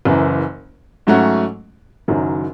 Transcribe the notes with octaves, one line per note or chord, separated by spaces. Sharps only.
F#1 F#2 E3
G#2 F#3 A3 C#4 F#4
F#1 F#2 D#3 F#3